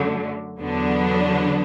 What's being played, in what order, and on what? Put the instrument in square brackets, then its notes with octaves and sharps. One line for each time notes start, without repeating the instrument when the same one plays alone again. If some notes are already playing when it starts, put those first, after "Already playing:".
Already playing: [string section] F#2 D3 F#3 A3
E2 D3 F#3 B3 D4